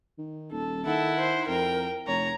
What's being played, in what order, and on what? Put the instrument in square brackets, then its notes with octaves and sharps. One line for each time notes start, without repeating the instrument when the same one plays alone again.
[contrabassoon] D#3
[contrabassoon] D#1 [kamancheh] A4
[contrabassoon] D#3 [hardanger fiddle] E4 F#5 [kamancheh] A4
[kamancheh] C5
[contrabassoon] F2 [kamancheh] A#4 [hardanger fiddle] G5
[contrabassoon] F1 [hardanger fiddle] C#5 [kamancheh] A#5